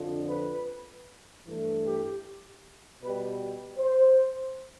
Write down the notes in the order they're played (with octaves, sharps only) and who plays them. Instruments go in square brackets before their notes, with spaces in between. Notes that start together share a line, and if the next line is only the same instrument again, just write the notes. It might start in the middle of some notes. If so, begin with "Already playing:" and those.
Already playing: [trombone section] F2 D3 F3
B4
G2 E3 A3
G4
B2 G3 B4
C5